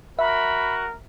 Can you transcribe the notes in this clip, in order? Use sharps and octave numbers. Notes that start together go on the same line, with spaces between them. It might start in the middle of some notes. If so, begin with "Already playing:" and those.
F#4 A#4 E5 B5